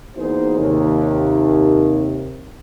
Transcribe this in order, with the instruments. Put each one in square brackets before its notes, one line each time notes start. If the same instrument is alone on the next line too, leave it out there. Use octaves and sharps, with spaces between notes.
[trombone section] E2 A#3 D#4 F#4 G#4 C5
D#2 C3